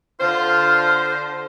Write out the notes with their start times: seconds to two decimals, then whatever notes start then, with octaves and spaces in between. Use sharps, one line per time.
0.21 D3 F4 C5